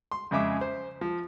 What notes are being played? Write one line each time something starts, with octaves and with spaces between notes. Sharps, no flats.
C6
F2 C#3 G#3 E5 D6
C5
F3